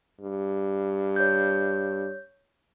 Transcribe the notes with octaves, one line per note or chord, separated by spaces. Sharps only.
G2
C#5 G6